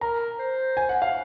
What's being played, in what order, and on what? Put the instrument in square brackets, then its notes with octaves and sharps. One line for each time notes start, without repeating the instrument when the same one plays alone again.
[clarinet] A#4 [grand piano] A#5
[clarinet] C5
[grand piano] G#5
F#5
F5